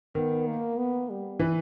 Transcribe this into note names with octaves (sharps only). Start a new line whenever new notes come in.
D#3 B3
A#3
B3
G3
E3